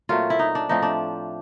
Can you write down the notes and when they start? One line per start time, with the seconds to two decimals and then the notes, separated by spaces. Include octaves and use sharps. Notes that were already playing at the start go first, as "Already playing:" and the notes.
0.09 A#2 F#3 A3 C4 F4
0.30 E4
0.39 D#4
0.55 D4
0.69 A2 F3 A3 C4 D#4
0.83 D4